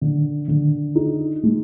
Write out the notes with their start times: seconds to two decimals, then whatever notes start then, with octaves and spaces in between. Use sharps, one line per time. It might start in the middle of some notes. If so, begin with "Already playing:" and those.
0.01 D3
0.48 D3
0.96 D#4
1.43 G#3